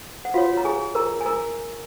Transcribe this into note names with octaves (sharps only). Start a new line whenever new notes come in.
F#5
F4 F#4 C#5 F5
A#5
G#4 G#5
A#4 A#5
G#5
A#4 A#5